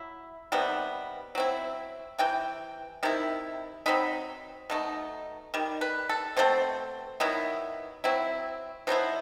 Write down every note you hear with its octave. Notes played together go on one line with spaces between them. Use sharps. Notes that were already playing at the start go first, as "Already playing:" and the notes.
Already playing: F#3 E4
C3 D#3 G3 B3
F#3 C4 E4
C3 E3 G5
C3 D#3 E4
F#3 C4 D#4 B5
B2 A3 D#4
D#3 G3
B4
A4
B2 A3 C4 C5
D#3 F#3 B3 E4
F#3 C4 E4
B2 F#3 B3 E4 C5